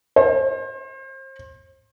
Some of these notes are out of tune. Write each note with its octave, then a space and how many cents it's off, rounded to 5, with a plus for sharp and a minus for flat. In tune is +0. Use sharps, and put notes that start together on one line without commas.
C5 +35